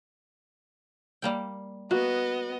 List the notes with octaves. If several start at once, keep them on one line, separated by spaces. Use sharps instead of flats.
G3 A#3 G5
A#3 B3 F#4 D#5